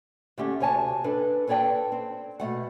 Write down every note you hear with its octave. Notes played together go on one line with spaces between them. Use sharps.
D3 A3 C#4 G4
D2 C3 C#5 G#5 A5
D4 A4 B4
A4 B4 C#5 D5 G5 A5
C4
B2 F#3 A3 F#5